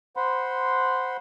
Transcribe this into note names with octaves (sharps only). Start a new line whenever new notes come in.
C5 F#5 B5 C6